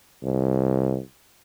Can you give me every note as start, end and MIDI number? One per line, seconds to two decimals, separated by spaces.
0.23 0.98 36